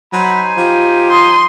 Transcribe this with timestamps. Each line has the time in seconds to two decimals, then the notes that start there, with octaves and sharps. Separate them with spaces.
0.13 F#3 D#4 C5 G#5 B5
0.57 F3 G4
1.11 C6 D#6